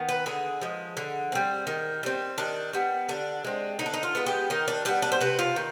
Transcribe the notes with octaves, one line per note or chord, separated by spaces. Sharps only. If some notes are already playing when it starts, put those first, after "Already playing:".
Already playing: D#3 B3
B4
D3 G#4
F3 G#3
D3
G3 C4
D#3
G3 C4
D#3 D4
G3 B3
D3 D4
G#3 C4
D3 D#4
D4
D#4
F4
G#3 B3
G4
D#3 D#4
D4
G3 B3 D4
D4
C5
C3 B4
F4
D#3